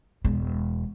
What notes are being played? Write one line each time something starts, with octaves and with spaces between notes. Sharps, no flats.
E1 G#3